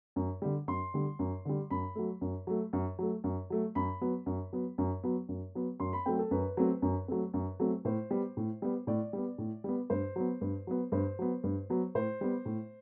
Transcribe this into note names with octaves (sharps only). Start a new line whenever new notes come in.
F#2
D3 G3
F#2 C6
D3 G3
F#2
D3 G3
F#2 B5
F#3 A3
F#2
F#3 A3
F#2
F#3 A3
F#2
F#3 A3
F#2 B5
F#3 B3
F#2
F#3 B3
F#2
F#3 B3
F#2
F#3 B3
F#2 C6
B5
F#3 A3 C4 G5
A4
F#2 B4
F#3 A3 C4
F#2
F#3 A3 C4
F#2
F#3 A3 C4
A2 C5
G3 B3
A2
G3 B3
A2 D5
G3 B3
A2
G3 B3
G2 C5
F#3 B3
G2
F#3 B3
G2 C5
F#3 B3
G2
F#3 B3
A2 C5
G3 B3
A2